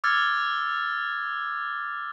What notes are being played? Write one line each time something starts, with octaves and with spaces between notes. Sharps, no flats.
D6 E6 F6 G#6 A6